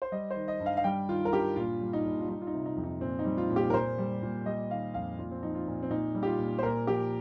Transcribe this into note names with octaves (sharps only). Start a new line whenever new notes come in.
C5
G3 D#5
C5
D#3
D#5
G2
F5
F5
G3 G5
D#3 F4
A#4
G2 G4
A#2 F4
G3
D#4
A#2
F4
G3 D#4
F4
D#4
C3
D#4
F2
D#4
A#2 C4
D#4
G3
F4
A#2
G4
A#4
A#2 C5
G3
A#2
G3 D#5
D#3 F5
F2 F5
A#2 F4
C4
F3 D#4
F4
A#2
C4
A#2 D#4
G3
G4
F4
A#2
C5
A#2 A#4
F3 G4